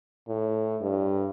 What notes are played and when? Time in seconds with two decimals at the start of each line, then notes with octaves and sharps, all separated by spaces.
0.28 A2
0.81 G2